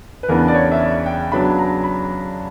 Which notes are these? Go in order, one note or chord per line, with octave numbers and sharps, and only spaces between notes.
B4
E2 C#3 E3 B3 D4 A#4
D5
C#5
E5
D5
G5
C#3 F#3 B3 D4 B5
A#5
B5